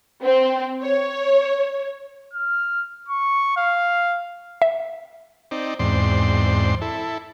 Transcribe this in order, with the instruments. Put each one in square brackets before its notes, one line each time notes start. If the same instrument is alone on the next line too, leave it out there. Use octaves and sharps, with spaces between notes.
[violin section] C4
C#5
[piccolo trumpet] F6
C#6
F5
[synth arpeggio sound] E5
[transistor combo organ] C4 D#4 D5
E2 G#2 C4 D5 C6
E4 A4